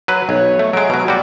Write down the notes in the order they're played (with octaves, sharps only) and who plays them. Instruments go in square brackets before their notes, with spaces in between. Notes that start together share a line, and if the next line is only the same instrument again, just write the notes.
[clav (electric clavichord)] F#3 B4
[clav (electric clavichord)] B1 [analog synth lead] C#5
[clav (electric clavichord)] A3
[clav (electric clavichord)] F#3 G#3 [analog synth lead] D7
[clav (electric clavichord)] B2 F#3
[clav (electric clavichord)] G3 F#4 [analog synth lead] D5